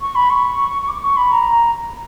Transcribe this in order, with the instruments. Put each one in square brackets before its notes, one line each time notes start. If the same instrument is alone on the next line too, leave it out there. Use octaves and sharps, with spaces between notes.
[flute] C#6
B5
C#6
C#6
D6
C#6
B5
A#5